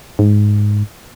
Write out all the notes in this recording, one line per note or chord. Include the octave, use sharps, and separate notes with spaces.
G#2